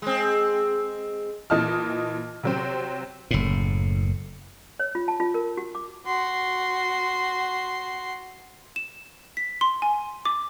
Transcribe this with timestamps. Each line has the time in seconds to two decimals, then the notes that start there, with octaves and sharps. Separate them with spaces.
0.02 G#3 C4
1.50 A#2 E3 D#5 A5 F6
2.43 C3 F#3 C4
3.31 F#1 A2
4.79 C#5
4.95 F4
5.08 A5
5.20 F4
5.34 A#4
5.57 F#4
5.75 D6
6.06 F#4 C6
8.76 E7
9.37 B6
9.61 C6
9.82 G#5
10.25 D6